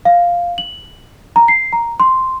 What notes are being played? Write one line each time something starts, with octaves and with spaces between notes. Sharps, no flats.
F5
F#7
A#5
C7
A#5
C6